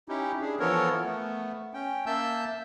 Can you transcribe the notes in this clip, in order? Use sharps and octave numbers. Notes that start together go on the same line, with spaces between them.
C#4 D#4 E4 G4
D4 G#4
E3 F3 B3 A4 A#4 C#5
A3 B3
C#4 G5
A#3 E5 A5 E6 G6